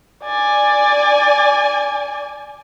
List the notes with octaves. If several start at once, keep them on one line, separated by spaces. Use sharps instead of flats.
D5 G#5